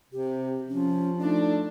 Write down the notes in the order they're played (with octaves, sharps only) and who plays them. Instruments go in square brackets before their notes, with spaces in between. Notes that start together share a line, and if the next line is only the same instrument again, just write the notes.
[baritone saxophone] C3 [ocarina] G4
[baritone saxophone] F3 [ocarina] C#4
[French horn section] A3 D4 [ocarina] D#4